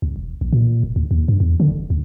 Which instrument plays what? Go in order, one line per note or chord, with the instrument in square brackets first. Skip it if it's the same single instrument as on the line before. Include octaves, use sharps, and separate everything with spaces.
[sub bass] C#2
E1
A#1
A#2
F1
D2
D#2
G2
E2
D3
F#1
D2